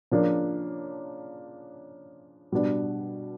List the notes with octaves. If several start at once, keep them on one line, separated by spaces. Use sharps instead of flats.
C#3 F3 A#3 D4
B2 G3 B3 D4